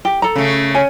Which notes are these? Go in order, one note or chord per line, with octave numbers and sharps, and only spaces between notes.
G4
A4 A#5
C#3 A3
C#4 G#5